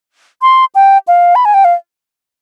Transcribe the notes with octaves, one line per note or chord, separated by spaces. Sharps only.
C6
G5
F5
B5
G#5
G5
F5